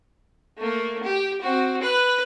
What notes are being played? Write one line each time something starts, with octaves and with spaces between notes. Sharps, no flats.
A3 A#3
G4
C4 F#4
B4 F#6